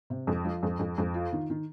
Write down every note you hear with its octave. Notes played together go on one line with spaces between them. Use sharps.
C3
F2
F3
F2
F2
F2
F4
D#3
D#3